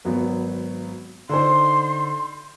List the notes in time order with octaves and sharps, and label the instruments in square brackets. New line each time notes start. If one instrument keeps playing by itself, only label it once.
[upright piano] G#1 F#3 B3
[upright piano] D3 D#4 C5 [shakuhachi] C6